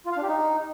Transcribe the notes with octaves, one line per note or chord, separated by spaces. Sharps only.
F4
F5
D4
G4
D#4